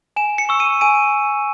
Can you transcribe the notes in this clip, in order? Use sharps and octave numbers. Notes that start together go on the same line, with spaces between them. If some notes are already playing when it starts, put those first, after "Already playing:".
G#5 E7
C#7
C#6 E6
D#7
G#5 D#7